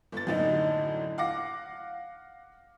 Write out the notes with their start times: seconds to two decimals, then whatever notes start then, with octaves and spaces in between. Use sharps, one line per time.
0.12 G1 A6
0.27 F#2 A2 D3 D4 D#4
1.18 F5 F#5 D6 A#6